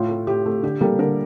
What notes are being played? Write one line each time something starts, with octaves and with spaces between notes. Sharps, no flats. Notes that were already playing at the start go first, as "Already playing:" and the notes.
Already playing: A2 F4
A3
A2 G4
A3
D3 G4
G3 A#3 A4
D3 A#4